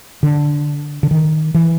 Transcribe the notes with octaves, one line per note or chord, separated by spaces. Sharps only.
D3
D3
D#3
E3